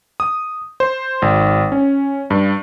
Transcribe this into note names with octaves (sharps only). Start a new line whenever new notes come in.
D#6
C5
G#1
C#4
G2